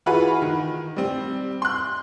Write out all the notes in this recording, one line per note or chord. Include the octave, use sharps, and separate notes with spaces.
E3 F4 F#4 G#4 B4
D#3
G3 C4
C6 F#6